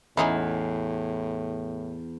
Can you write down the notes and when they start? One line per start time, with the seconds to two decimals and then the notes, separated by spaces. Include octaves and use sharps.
0.17 E2 A2 C#4 D#4 E4